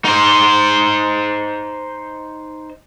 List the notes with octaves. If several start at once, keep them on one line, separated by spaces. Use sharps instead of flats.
D#4 C5